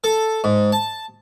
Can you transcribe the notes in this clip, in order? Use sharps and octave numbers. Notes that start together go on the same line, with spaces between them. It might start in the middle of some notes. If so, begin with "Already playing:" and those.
A4
G#2
A5